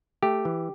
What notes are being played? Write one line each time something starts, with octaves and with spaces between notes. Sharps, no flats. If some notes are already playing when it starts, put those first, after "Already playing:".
A3 G4
E3